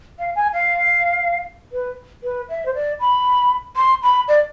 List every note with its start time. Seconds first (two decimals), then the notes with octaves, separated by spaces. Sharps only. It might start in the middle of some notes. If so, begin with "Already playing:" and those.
0.19 F5
0.35 G#5
0.53 F5
1.72 B4
2.23 B4
2.49 E5
2.65 C5
2.74 D5
3.00 B5
3.76 C6
4.02 B5
4.28 D5